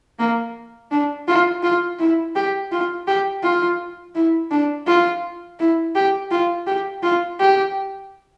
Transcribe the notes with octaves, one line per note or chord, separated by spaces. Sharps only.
A#3
D4
F4
F4
E4
G4
F4
G4
F4
E4
D4
F4
E4
G4
F4
G4
F4
G4